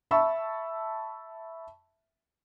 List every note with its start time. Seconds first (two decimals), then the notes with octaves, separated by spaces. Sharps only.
0.11 E5 A5 B5 C#6 E6